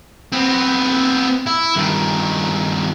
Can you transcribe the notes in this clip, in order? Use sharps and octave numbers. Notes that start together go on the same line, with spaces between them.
B3 C4
E4
G2 D#3